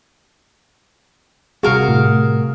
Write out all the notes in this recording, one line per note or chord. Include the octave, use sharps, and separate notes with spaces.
C3 G3 F#4 G#4 A#4 F5
A2